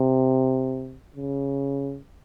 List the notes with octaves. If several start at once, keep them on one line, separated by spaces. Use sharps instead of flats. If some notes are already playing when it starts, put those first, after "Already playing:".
Already playing: C3
C#3